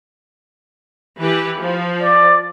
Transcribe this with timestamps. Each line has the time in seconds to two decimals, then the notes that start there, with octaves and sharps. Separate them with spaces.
1.21 E3 G4 B4
1.59 F3
2.01 D5